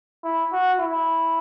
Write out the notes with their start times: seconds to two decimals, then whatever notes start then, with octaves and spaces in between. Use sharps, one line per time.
0.24 E4
0.52 F#4
0.80 E4